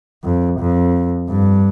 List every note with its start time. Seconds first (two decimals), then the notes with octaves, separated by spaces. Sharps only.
0.24 F2
0.59 F2
1.29 G2